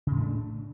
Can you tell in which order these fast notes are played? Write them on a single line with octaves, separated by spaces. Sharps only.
C#3 A2 A3 D4